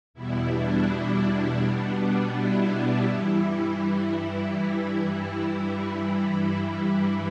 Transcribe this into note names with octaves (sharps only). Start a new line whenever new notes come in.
E2 B2 G3 E4
D4
D4
D4
B2 G3 B3
E4
G2 E3 G3 E4